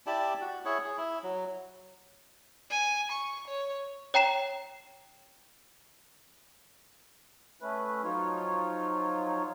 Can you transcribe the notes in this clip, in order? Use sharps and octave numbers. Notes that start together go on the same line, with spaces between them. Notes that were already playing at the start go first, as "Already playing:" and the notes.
E4 G4 D5 A5
F#4
E4 G#4 C#5
G#4
E4
F#3
G#5
C#6
C#5
C#5 G5 A#5 C7 E7
A3 C#4 B4
F3 F#3 D#4 F4 C#5